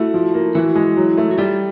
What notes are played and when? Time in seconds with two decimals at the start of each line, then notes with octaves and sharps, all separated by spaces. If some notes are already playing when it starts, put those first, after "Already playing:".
Already playing: A3 E4 F#4
0.14 F3
0.34 A#3
0.55 E3 E4 F#4
0.75 G#3
0.97 F#3
1.17 A3
1.31 F#4
1.38 G3 F4 G4